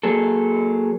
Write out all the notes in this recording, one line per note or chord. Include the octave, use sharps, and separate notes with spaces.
F#3 A#3 G#4 A4